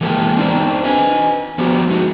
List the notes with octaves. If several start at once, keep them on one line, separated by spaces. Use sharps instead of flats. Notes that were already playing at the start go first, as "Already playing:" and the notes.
E3 G#3 A#3 G4 A4
C4 D4 D#4 A#4 C5 D5
B4 D#5 G#5
F3 B3 F#4 G4
G#3 D#4 F#4